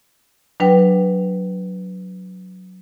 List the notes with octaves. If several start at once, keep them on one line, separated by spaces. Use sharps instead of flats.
F#3 D4 B4 G5